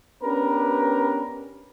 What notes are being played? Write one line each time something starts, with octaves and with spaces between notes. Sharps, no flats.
B3 C#4 D4 G4 A#4 B4